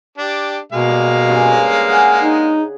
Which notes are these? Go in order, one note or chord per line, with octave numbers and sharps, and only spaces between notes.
D4 G4
B2 G#3 A#3 F5
G3
G2 C#3
G#4 F#5
D#4